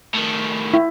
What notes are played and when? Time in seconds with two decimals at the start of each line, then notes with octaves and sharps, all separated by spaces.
0.15 A2 D#3
0.74 E4